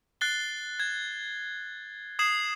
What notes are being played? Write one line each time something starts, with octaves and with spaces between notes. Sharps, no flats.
F#6 A6 C7 G7
G#6
D#6 G#6 C7 E7 F#7